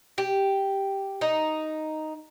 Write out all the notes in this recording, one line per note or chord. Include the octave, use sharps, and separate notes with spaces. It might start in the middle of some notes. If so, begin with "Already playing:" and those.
G4
D#4